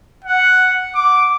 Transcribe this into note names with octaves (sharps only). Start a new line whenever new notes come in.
F#5
D6